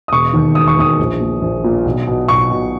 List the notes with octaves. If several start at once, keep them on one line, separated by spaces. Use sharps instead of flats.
D#6
E1 C#6
D#2 D#3
E1 D#6
C#6
D#2 D#3 D#6
A#1
A#2
A#1
A#2
B1
B2
B1 C#6
B2